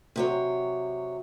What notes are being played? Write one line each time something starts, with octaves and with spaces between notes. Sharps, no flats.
C3 F#3 C#5